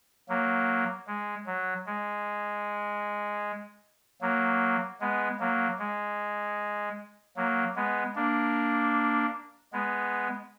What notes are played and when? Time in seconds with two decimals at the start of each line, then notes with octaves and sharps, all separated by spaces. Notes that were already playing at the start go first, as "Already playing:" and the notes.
0.29 F#3 A#3
1.07 G#3
1.46 F#3
1.87 G#3
4.21 F#3 A#3
5.01 G#3 B3
5.39 F#3 A#3
5.79 G#3
7.36 F#3 A#3
7.76 G#3 B3
8.16 A#3 D4
9.73 G#3 B3